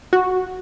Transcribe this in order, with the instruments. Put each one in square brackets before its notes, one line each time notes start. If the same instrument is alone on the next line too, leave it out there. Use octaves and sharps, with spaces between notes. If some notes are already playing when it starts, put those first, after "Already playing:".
[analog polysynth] F#4